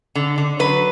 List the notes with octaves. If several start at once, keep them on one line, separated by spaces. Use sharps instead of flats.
D3
D3
F#3 B4